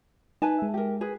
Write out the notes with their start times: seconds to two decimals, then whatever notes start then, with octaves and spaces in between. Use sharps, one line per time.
0.42 D#4 B4 G#5 A5
0.58 G#3 E5
0.74 G4 A#4
1.01 G#4 B4